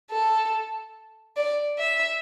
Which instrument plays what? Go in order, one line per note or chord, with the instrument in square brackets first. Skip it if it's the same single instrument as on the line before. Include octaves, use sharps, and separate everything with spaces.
[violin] A4
D5
E5